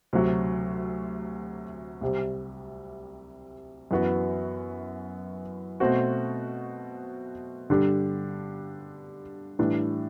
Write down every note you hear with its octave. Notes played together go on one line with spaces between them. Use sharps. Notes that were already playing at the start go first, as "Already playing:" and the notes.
D2 C3 F#3
C2 C3 G3
F#2 E3 B3 F#4
B2 A3 C4 F#4
G2 D3 G3 D4 G4
A2 E3 G3 D4